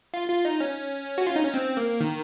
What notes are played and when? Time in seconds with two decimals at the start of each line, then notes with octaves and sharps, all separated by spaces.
0.14 F4
0.29 F4
0.45 D#4
0.60 C#4
1.18 F#4
1.27 F4
1.36 D#4
1.45 C#4
1.54 C4
1.77 A#3
2.00 D#3